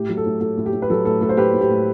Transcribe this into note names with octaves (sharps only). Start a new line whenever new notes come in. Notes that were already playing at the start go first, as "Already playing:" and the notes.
Already playing: A2 G4
F#3
A4
A2
A2 A4
A2
G4
A2
B4
F#3 A4
A2 A4
A2 A4
C5
A2 G4 B4
A2
G4
A2